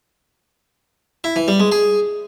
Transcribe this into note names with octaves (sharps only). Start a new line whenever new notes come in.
E4
E3
G3
G#3
G#4